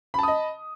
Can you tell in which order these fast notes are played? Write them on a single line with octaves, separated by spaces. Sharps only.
B5 A5 D#6 D#5